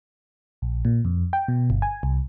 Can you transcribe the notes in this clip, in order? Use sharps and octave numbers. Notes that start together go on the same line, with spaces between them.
A#1
A#2
F2
G5
B2
G1
G#5
C2